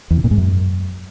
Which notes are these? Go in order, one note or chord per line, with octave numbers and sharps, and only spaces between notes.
E2
C3
A#2
G#2
F#2